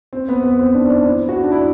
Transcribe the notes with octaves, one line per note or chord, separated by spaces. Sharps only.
C4
B3
B3
C4
D4
D4
E4
F#4
D4
E4